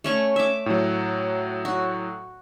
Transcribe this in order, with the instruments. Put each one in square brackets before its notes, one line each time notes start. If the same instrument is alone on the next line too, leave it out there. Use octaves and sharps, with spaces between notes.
[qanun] A3 C#4 C#6
E5 D6
[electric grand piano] A2 F#3
[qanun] F#4